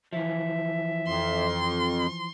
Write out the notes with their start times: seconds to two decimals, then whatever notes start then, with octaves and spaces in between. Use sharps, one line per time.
0.13 E3 F3 E5
1.07 F2 C6